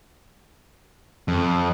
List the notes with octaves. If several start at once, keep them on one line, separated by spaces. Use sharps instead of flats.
F2